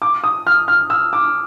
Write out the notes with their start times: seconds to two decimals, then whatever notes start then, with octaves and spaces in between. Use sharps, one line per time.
0.02 D6
0.24 D#6
0.47 F6
0.68 F6
0.90 E6
1.13 D6